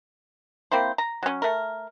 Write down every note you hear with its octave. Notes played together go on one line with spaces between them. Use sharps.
A#3 C4 E4 C5
A#5
F#3 C#4
A3 A#4